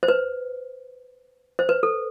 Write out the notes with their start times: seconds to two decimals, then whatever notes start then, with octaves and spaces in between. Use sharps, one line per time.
0.03 C5
0.08 B4
1.59 C5
1.69 B4
1.83 A4